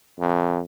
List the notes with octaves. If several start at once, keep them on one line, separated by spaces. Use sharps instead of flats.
F2